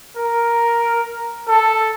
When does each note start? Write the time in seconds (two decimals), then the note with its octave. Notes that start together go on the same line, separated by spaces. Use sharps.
0.17 A#4
1.48 A4